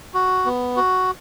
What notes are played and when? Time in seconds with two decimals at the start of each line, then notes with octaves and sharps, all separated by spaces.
0.14 F#4
0.45 B3
0.76 F#4